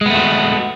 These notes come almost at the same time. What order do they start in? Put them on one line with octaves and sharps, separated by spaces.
G#3 B3 A3 F#4